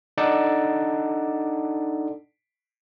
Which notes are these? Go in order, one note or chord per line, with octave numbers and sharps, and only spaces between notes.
D4 D#4 A4 D5 F#5 A5